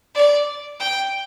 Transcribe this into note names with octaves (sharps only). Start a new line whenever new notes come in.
D5
G5